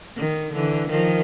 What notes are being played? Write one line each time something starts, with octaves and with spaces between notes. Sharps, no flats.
D#3
D3 E3
D#3 F3